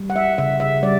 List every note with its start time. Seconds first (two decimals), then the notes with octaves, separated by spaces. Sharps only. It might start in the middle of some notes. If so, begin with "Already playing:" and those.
Already playing: G3
0.10 F#5
0.16 E5
0.38 C#3 E5
0.60 E5
0.83 G3 D5